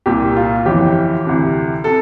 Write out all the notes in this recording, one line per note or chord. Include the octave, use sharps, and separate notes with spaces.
C2 A#2 G4
F4
G1 F2 E3 G4
D2 C3 E3
C3 A4